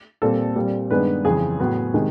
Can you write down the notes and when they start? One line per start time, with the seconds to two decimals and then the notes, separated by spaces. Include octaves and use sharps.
0.22 A#2 G3 C4 A4
0.56 A#2 G3 C4
0.90 G2 D#3 G#3 B3 D4 B4
1.25 F2 C#3 E3 G#4
1.60 A2 F#3 B3
1.94 C3 D#3 G#3